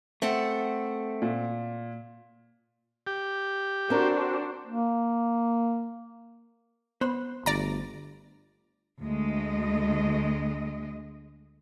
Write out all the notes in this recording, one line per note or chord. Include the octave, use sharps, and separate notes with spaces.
A3 C4 A4 F#5
A#2
G4
C4 D4 F#4 A4 A#4 C5
A#3
B3 C5 C6
G1 D2 D5 A#5
D2 G#3 D#5